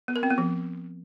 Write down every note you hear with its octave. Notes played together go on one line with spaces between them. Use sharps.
B3
A#4
C4
B3
F3